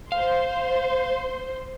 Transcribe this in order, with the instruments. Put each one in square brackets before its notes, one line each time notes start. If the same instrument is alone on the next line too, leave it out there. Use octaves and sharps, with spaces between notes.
[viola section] C5 C6 [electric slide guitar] F5